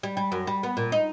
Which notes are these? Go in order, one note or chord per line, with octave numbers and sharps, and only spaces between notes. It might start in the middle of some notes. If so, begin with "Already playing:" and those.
G3
G3
F#2
G3
B3
A#2
D#4